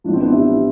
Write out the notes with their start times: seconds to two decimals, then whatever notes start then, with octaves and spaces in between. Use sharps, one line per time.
0.04 A1 A2 F3 D4
0.13 C4
0.21 B3 D4
0.31 E4 G4